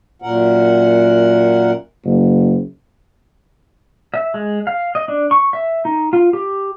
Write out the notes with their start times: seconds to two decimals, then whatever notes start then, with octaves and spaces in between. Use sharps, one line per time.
0.22 F#2 A#2 A#4 F#5
2.05 F#1
4.14 E5
4.34 G#3
4.67 F5
4.95 D#5
5.08 D4
5.31 C#6
5.53 E5
5.85 D#4
6.13 F4
6.33 G4